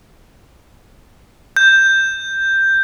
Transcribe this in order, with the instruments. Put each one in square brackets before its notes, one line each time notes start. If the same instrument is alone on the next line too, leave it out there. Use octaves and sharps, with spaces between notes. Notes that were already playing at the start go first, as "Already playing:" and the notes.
[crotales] G6